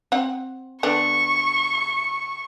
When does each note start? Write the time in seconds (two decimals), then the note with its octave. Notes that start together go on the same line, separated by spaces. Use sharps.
0.12 C4 F#5
0.83 D3 B3 D4 C#6